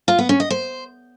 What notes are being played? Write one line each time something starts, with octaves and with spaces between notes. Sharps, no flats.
F4
B3
C#4
D#5
C5